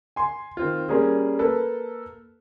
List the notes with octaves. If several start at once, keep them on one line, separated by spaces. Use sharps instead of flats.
G#5 C6
D#3 C4 F4
G3 A#3 C#4 G#4
A#3 A4 B4